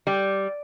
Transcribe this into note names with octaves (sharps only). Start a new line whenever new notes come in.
G3